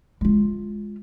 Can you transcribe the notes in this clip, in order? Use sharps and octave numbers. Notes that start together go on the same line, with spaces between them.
G#3 F4